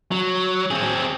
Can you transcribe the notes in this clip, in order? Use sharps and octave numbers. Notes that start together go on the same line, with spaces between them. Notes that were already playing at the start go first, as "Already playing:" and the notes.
F#3
C4 G#4